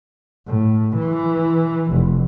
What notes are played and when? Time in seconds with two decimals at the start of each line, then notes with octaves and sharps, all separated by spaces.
0.47 A2
0.96 E3
1.92 F1